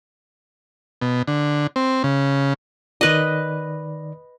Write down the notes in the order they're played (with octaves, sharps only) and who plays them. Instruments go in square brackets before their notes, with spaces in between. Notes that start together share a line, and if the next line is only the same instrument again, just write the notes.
[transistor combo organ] B2
D3
C4
C#3
[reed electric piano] D#3 D5 [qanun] B4 D#5